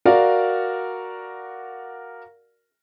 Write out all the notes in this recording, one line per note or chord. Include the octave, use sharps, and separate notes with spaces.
F#4 A#4 D5 F5 F#5